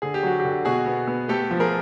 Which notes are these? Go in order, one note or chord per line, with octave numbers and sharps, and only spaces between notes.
D3 G#4
G4
F#3 F#4
G4
D3
B2 F#4 G#4
B3
B3
A3 G4 A4
F3
G#4 A#4